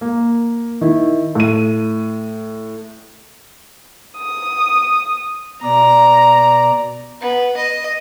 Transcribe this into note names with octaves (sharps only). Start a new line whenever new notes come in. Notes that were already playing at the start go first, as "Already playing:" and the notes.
A#3
D#3 E4
A2 D#7
D#6
B2 D5 A#5
B3
D#5